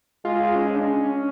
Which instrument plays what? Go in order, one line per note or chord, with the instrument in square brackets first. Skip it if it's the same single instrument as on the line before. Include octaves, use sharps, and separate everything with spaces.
[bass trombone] G#3 [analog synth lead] F4
[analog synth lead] C#4
D4
C#4